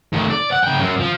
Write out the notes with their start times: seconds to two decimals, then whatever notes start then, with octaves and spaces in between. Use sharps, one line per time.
0.13 D#3 A3
0.30 D5
0.51 F#5
0.63 C#3 G5
0.79 F#2
1.00 F3